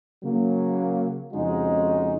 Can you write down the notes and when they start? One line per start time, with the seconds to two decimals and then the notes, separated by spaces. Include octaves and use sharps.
0.23 C#3 F#3 A#3
1.32 F2 C#3 G#3 D#4 F#4